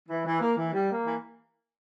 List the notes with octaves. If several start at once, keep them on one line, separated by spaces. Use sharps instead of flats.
E3
E3
A#3
E3
G3
A#3
E3